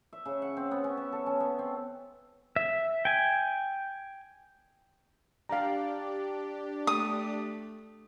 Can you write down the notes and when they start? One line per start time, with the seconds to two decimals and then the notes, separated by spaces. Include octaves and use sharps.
0.13 E5
0.25 C#3
0.42 F#5
0.57 C4
0.71 B3
0.84 C#4
0.97 E5
1.12 A4
1.26 C#4
1.40 B3
1.59 C4
2.56 E5
3.05 G5 G#5
5.49 D4 G4 D5 F5 A#5
6.87 A3 D#6